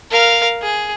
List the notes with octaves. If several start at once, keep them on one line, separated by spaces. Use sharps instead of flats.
A#4 F5
G#4